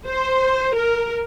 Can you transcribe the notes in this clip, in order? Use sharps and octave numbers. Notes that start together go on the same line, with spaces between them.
C5
A#4